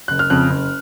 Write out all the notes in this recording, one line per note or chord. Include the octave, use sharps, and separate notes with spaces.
F#1 F#6
F6
F2 C#3 F#6
F#1